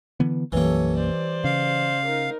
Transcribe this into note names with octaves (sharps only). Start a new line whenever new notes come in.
D3 E3 B3
B1 F#2 E3 G3 A#3 A4 C#5
C5 D5
C#3 F5
D#4 A#4